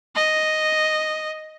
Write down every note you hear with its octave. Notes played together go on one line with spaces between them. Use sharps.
D#5